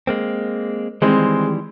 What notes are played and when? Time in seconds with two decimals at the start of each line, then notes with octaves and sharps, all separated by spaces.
0.07 G#3 A#3 C4
1.02 D#3 E3 G3 G#3 C4